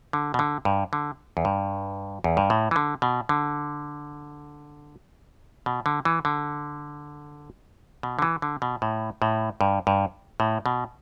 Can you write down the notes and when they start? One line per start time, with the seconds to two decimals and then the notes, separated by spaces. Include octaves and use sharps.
0.13 D3
0.34 B2
0.39 D3
0.65 G2
0.93 D3
1.37 E2
1.45 G2
2.24 E2
2.37 G2
2.50 A2
2.71 E3
2.76 D3
3.02 B2
3.29 D3
5.66 B2
5.86 D3
6.05 E3
6.25 D3
8.03 B2
8.19 D3
8.22 E3
8.42 D3
8.62 B2
8.82 A2
9.22 A2
9.61 G2
9.87 G2
10.40 A2
10.66 B2